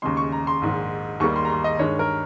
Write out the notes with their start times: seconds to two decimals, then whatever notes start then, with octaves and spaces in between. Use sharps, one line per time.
0.02 D#2 C#3 G#3 C6
0.17 C#6
0.32 A#5
0.47 C6
0.62 A#1 G#2 D#3
1.20 D#2 D#3 G3 A#3 C#6
1.36 C6
1.45 A#5
1.50 C6
1.64 D#5
1.79 G2 D#3 G#3 C#5
1.99 A#4